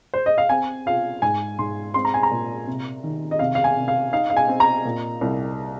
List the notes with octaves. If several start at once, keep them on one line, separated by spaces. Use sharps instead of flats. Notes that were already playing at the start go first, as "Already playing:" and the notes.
C5
D#5
F5
C4 G#5
F4 F5
G#2 G#5
G#2 C6
C4 C6
A#5
G#5
A#5
A#2
C3
D#3
D#5
C3 F5
F5
G#5
C3
F5
D#4 F5
F5
G#5
C4
A#5
A#2
C2